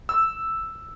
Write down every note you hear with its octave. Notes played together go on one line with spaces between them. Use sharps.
E6